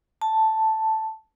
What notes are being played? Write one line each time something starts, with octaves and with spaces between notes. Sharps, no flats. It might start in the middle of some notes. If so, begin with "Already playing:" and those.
A5